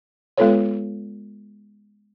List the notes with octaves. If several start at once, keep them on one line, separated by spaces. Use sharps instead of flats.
G#3 B3 F4 A4 B4 C#5